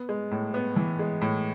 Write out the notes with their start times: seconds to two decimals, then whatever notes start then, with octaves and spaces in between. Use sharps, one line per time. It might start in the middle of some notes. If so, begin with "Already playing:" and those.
Already playing: B3
0.09 G#3
0.31 A2
0.54 B3
0.76 E3
0.99 G#3
1.21 A2